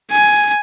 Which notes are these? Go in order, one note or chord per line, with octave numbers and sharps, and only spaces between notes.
G#5